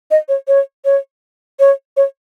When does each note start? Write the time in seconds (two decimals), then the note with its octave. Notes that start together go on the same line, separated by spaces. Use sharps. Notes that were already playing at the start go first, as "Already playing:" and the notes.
0.11 D#5
0.29 C#5
0.48 C#5
0.85 C#5
1.60 C#5
1.97 C#5